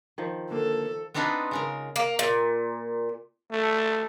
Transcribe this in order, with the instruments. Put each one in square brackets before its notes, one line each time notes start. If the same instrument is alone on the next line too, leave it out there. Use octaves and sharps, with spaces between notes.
[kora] D#3 F3
[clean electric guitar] D3 A#3 [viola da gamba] A4
[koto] B3 C4 D4 D#4 F4 B4
C#3 G#3 A#4
[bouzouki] A#3
A#2
[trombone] A3